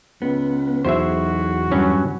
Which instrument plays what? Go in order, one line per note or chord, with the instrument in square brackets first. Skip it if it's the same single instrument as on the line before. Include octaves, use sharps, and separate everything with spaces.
[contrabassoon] C#2 [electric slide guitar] B3
[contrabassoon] B1 [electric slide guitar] E2 E4 G#4 [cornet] F#4 [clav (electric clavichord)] C5 E5
[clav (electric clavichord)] G2 F#3 C#4